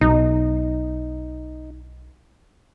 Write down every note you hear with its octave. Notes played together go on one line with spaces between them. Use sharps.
B1 D#4